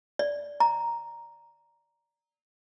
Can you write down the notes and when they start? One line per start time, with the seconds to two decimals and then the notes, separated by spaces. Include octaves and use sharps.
0.19 D5
0.60 A#5